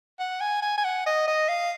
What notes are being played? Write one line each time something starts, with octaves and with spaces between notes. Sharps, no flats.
F#5
G#5
G#5
G#5
F#5
D#5
D#5
F5